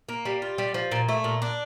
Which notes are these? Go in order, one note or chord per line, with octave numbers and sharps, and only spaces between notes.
A#3
G3
F4
G3
F3
A#2
A3
A#2
D4